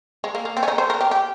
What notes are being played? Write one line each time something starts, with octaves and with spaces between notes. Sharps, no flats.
G#3
A#3
A#3
C4
C#4
D#4
C5
A#4
G4
G4